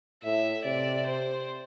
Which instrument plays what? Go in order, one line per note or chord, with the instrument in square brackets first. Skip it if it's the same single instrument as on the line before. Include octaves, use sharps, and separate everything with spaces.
[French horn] A2 [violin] E5
[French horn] C3 [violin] D5
[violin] C5